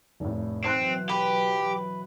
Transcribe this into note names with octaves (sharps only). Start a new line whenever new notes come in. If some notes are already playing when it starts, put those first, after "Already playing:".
F1 A2
B2 E3 F#3 C4 A5 C6 F#6
G4 B4